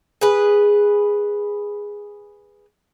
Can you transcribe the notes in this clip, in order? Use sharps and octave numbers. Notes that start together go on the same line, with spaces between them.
G#4 B4